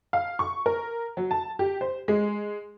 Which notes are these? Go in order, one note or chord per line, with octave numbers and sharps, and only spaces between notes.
F5
C#6
A#4
F#3
A5
G4
C5
G#3